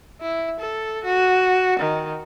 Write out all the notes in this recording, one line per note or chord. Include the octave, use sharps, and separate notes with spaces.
E4
A4
F#4
D#3